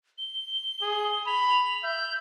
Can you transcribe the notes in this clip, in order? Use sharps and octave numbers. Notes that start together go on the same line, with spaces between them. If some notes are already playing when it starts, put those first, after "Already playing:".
G7
G#4
B5 F7
E5 G6